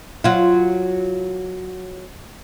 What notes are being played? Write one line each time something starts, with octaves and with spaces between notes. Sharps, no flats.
F#3 F4